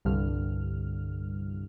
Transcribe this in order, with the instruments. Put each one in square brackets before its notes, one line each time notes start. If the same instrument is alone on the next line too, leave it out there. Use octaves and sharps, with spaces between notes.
[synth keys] C2 G2 D3 F6